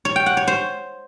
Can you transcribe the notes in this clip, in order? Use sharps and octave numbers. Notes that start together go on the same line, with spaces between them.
C#5
G5
F#5
C#5
C5